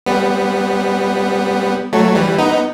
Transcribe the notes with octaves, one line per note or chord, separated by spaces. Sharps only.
G3 B3
F#3 A3
E3 G3
B3 D#4